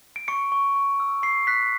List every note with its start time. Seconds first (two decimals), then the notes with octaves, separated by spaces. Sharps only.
0.16 D7
0.28 C#6 C#7
0.52 C#6
0.76 C#6
1.00 E6
1.23 C#6 C7
1.47 F#6 B6